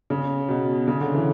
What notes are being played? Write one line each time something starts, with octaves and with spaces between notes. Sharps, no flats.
C#3
B2
C#3
D3
E3